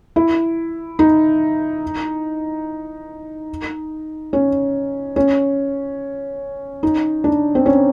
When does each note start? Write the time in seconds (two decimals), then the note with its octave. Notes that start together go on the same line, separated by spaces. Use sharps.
0.16 E4
0.99 D#4
4.33 C#4
5.16 C#4
6.83 D#4
7.24 D4
7.55 C4
7.66 C#4